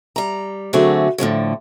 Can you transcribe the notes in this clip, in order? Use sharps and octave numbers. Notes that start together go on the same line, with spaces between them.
G3 A#5
D3 F#3 A3 C4 F#4 G#4
A2 D3 F3 F#3